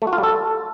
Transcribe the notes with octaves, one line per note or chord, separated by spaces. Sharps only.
A3
F#4
F4
G3
A4